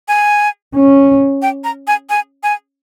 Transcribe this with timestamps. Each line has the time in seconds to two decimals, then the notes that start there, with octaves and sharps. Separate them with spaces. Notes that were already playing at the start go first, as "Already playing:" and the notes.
0.08 G#5
0.75 C#4
1.42 G5
1.64 A#5
1.87 G#5
2.10 G#5
2.43 G#5